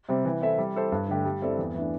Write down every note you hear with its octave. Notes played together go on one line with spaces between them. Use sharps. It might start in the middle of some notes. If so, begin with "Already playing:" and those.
C3 G3 C4
E3
C4 E4 A4 E5
G3
E4 A4 C5
G2
D3 A3 D4 G4
G3
C4 E4 A4 D5
E2
E3 A3 D4